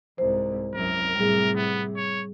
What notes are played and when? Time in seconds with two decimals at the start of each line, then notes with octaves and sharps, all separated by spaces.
0.18 C2 G#2 C5
0.75 C2 F#2 A#4
1.15 A2 C3 G3 G#4
1.56 B3
1.97 C#5